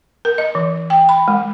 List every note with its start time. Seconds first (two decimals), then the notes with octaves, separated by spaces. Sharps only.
0.25 A#4
0.38 D#5
0.55 E3
0.90 G5
1.09 B5
1.28 G#3